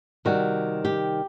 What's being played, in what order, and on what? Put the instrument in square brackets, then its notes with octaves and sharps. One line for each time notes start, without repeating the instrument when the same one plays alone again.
[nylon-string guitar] C3 D#3 G3 F#4
G4